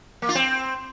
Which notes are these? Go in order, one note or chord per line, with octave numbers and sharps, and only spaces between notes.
A#3
F4
C4